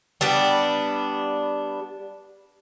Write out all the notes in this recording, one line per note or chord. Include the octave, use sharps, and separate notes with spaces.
G3 B3 D4